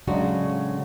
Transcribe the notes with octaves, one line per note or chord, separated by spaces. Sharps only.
A2 C#3 F#3 G#3 D4 F#4